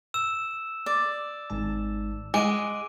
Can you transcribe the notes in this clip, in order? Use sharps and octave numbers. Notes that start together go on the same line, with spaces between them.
E6 E7
D5
G#1 G#2 A5
G#3 D#5 F#5 D6 D7 D#7